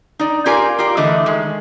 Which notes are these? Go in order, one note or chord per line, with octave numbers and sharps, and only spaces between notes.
D#4 D5
F4 G4 A#4 D5 F5 G#5
F4 G4 A#4 D5
D3 E3 A3 D#5
D#3 G#3